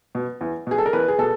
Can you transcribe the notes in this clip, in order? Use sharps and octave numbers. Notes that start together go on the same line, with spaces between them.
B2
E2
B2 G#4
A4
A#4
E2 B4
G#4
B2 A4